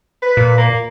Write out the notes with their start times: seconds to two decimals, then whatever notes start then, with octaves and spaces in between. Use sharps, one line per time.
0.22 B4
0.37 A#2
0.58 A#3